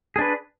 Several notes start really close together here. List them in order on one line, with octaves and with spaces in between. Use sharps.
G#4 D4 B4